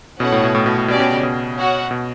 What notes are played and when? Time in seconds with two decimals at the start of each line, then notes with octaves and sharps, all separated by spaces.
0.20 B2 C#4 E4 A4 C#5 F#5
0.32 A2
0.44 B2
0.55 A2
0.66 B2
0.78 A2
0.88 B2 C#4 G4 D5
1.00 B2
1.12 C#3
1.23 B2
1.58 F#4 C#5 F#5
1.91 B2